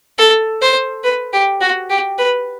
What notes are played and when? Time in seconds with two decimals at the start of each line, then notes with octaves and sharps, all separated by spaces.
0.18 A4
0.62 C5
1.04 B4
1.33 G4
1.61 F#4
1.90 G4
2.18 B4